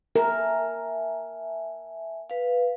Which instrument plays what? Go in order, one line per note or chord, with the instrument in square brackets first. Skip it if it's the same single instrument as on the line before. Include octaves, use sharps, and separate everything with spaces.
[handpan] A#4 [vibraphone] E5 G#5 A5
[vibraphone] B4 F5